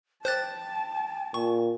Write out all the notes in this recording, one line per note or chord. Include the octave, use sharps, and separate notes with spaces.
C5 G5 A5 F#6 A6
A#2 C#6